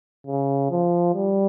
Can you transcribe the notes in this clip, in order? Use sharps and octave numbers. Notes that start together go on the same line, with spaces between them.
C#3
F3
G3